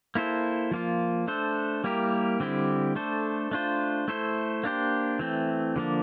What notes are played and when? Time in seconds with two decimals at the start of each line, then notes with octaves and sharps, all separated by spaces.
0.15 A#3 E4 A4 C5
0.71 F3 A#3 F4
1.27 A3 D4 A4 C5
1.84 G3 A#3 E4 G4 A#4
2.40 D3 G3 C4 E4 G4
2.96 A3 D4 A4 C5
3.51 A3 D4 F4 C5
4.08 A3 E4 A4 C5
4.64 A#3 D4 G4 C5
5.19 E3 A3 C4
5.76 D3 F3 A#3 D4